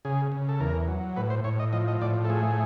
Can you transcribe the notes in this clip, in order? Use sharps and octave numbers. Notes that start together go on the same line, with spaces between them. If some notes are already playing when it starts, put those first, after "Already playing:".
C#3 G#4
C#3
A4
E2 A#4
F#3
A2 B4
C5
A2 C#5
D#5
F3 D#5
D#5
A2 D5
A4
A3 G#4